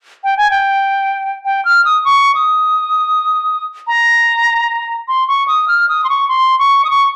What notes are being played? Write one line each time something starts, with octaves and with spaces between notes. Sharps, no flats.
G5
G#5
G5
G5
F6
D#6
C#6
D#6
A#5
C6
C#6
D#6
F6
D#6
C6
C#6
C6
C#6
D#6
C#6